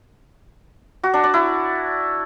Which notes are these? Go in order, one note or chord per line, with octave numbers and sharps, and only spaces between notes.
F#4
D4
D5
E4